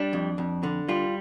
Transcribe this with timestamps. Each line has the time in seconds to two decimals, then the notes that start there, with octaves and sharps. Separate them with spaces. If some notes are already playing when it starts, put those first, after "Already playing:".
Already playing: G3 D4
0.13 F2
0.38 F2
0.63 D3
0.88 G3 F4